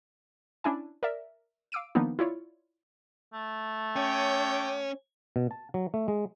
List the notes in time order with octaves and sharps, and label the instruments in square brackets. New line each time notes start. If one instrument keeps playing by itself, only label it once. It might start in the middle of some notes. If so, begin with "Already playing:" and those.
[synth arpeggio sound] C#4 D4 E4 G#5
A#4 D5 E5
F5 D6 E6 D7 D#7
D#3 F3 A#3 B3 D4 D#4
E4 F4 C#5 D5
[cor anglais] A3
[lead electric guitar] C#4 [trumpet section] C#5 G5 D6
[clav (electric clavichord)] B2
A5
F#3
A3
G#3